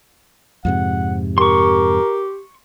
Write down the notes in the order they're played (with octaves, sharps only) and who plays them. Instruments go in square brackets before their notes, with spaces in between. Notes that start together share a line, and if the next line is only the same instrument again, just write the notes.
[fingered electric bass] F2 G#2 C3 [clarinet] F#5
[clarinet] G4 [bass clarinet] A#4 [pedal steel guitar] C6 C#6